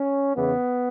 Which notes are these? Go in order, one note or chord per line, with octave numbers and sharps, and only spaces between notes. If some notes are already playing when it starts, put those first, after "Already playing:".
Already playing: C#4
E2 C#3 E3 B3